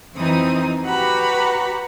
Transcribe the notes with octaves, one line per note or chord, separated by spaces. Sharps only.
F2 E3 C4 D#4 D#6
F#4 G4 B4 F#5 A#5 B5